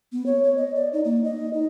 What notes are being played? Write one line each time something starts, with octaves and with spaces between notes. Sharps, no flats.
B3
C#5
C#5
D#5
D5
D#4
A#3
D#5
D#4